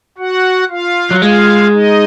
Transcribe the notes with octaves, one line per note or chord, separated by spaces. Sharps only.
F#4 F#5
F4 F5
F#3
G#3 F4 F5
D#4 D#5